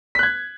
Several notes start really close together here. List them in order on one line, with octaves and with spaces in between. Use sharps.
B6 F#6 G#6